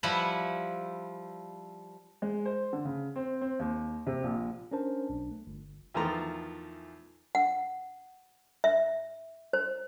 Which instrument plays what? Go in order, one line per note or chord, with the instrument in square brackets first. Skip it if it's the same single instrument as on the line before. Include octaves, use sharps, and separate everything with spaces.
[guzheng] F3 G3 E4 F#5 G#5 B5
[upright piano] G#3
C5
D3
C#3
C4
C4
D#2
C3
A#1
[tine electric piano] C#4 D4 A#4 C5 A5
B1 D4
A3
G1
[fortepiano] E2 D#3 F3 A3 A#5 C6
[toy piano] F#5
E5
C5